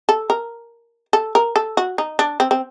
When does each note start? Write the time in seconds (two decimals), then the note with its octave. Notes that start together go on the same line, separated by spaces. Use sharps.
0.09 A4
0.30 A#4
1.13 A4
1.35 A#4
1.56 A4
1.77 F#4
1.98 D#4
2.19 D4
2.40 C4
2.51 C4